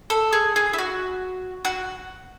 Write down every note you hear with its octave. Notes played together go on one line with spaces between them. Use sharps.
A4
G#4
G#4
E4
F#4
F#4